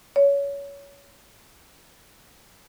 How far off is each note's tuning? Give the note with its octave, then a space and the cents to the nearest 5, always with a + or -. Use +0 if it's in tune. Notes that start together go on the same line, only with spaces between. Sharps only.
C#5 +25